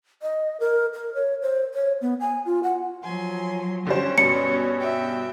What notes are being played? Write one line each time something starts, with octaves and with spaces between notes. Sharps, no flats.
D#5
A#4
A#4
C#5
C5
C#5
B3
G#5
F4
F#5
F3 F#3 G#5 C6
D3 G3 C#4 C5 G5
G2 B2 C#7
E5 G5